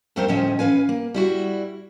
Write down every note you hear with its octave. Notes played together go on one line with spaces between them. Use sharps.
F2 G3 A3 C4 A#4 C5
D2 A2 F3 C4 C#4 D#5
E3 C#4 B4 F5 G#5
A#3
G3 E4 F#4